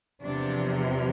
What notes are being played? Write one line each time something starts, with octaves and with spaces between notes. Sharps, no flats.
E2 C3 F3 D4